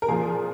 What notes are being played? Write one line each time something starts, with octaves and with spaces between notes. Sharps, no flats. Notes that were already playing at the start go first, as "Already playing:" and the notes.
A#4
A#2 F3 G#4